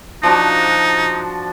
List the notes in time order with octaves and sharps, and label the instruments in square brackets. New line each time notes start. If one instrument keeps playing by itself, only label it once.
[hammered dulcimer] F3 D4 F#4 [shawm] D#4